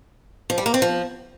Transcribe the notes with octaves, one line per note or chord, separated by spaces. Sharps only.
F3
G3
A#3
C4
F3